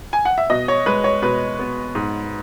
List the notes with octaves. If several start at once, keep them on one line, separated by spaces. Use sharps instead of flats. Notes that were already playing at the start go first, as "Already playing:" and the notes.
G#5
F#5
E5
B2 D#5
C#5
G#3 B4
C#5
B2 B4
B3
G#2